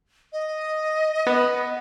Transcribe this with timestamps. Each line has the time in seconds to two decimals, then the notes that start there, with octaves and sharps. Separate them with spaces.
0.32 D#5
1.27 B3